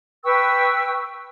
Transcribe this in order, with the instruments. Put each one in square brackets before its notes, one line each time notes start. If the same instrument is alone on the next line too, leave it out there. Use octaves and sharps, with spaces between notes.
[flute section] B4 G5 C#6 E6